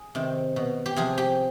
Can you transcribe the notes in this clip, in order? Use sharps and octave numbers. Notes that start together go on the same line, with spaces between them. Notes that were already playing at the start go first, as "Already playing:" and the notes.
Already playing: G#4
C3 D#3
B2
G4
C3 F3 G#4
G4